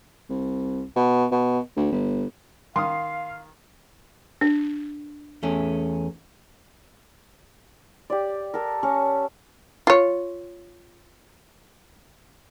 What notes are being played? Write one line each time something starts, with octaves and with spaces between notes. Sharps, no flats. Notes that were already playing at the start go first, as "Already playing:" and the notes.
C2
B2
B2
D2
G1
D#3 F5 C6 D#6
D4
E2 A3 C#4
G4 D5
A4 A#4
C#4 A4
F4 C#5